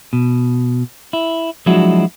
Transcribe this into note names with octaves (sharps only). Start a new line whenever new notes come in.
B2
E4
F3 F#3 G#3 D4 E4 F#4